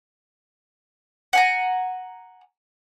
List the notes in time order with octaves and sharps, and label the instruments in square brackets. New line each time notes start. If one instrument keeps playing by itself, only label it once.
[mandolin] F#5 G#5 A#5